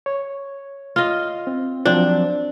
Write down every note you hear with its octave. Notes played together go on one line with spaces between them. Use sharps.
C#5
F4 D#5
C4
F3 F#3 C4 D4